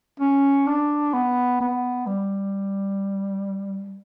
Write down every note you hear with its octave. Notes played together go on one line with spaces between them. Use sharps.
C#4
D4
B3
B3
G3